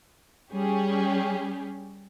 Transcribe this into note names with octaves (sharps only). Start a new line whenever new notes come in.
G3 C#4 G4 G#4